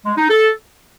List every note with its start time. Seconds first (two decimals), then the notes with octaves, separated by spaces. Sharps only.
0.06 G#3
0.18 D#4
0.30 A4